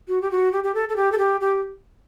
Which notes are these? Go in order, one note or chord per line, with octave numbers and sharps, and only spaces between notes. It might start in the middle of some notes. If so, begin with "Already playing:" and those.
F#4
G4
F#4
G4
G4
A4
A4
G4
A4
G4
G4